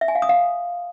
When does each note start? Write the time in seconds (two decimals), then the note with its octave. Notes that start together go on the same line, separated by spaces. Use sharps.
0.01 E5
0.08 G#5
0.15 F5
0.22 D#6
0.29 F5